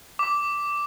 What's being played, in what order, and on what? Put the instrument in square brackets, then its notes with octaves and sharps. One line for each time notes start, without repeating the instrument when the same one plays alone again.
[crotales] D6